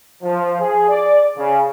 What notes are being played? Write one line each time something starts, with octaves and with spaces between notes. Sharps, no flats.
F3
G#4
D5
C#3